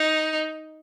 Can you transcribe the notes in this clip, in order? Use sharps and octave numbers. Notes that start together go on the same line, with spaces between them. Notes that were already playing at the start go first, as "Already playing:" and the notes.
Already playing: D#4